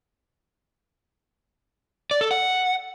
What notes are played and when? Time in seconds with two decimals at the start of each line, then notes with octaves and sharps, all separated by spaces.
2.11 D5
2.21 A4
2.31 F#5